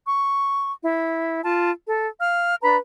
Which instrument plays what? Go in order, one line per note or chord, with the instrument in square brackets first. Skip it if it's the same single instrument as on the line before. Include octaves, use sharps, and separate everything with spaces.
[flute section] C#6
E4
F4 A5
A4
F5 F6
D4 B4 A#5 B5